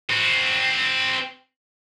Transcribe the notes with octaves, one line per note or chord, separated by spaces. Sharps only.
C4 F#4